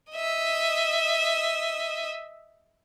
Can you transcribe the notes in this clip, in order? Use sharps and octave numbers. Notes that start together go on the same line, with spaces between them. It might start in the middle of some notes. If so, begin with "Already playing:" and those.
D#5 E5